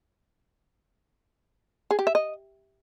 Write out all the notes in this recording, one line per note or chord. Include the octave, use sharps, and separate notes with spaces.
G#4
G4
E5
D#5